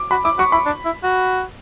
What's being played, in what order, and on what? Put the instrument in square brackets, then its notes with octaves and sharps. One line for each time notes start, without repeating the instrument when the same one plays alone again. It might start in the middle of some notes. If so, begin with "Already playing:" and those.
Already playing: [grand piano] D6
[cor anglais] F#4 [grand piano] B5
[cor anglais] E4 [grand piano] D6
[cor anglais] F#4 [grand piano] C#6
[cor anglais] E4 [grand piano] B5
[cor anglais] D4
E4
F#4